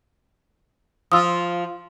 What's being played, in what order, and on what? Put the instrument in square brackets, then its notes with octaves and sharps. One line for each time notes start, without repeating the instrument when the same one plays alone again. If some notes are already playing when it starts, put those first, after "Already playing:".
[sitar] F3 F4 [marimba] D#6 E6